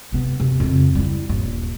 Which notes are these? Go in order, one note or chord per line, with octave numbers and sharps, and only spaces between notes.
C3 B3
F#2 C3
F2 C#3
G3 E4
D#1 G2